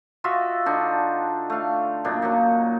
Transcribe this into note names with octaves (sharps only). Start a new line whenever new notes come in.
F4 F#4 D#5 E5
D3 D4 D#4
A3 F5
F#2 A#2 D4 D#4
F#3 A#3 D#4